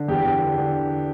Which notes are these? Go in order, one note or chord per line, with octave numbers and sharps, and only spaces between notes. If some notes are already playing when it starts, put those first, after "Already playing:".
Already playing: D3
E2 G4
E2
D3
D3